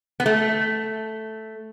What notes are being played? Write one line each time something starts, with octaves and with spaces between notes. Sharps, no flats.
B3
A3